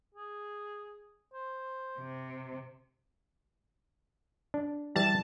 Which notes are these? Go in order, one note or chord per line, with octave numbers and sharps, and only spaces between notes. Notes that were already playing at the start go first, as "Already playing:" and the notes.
G#4
C5
C3
D4
E3 G3 A5